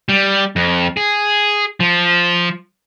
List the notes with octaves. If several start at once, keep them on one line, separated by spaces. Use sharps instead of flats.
G3
F2
G#4
F3